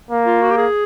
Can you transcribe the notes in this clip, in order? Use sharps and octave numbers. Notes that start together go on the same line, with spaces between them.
A#3
F4
F#4
G4
G#4